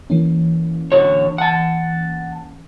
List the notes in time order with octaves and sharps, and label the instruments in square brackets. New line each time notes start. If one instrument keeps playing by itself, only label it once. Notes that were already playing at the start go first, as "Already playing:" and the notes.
[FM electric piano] E3 A#3 C#4
[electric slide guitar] D3 F#4 C#5
F#5 A5